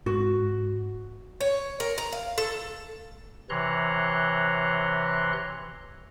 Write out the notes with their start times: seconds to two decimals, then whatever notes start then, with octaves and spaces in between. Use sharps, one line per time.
0.06 G#2 F#4
1.41 C#5
1.80 A#4
1.98 A#5
2.12 F5
2.38 A4
3.50 C3 E3 C#5 A#5 C6 F#6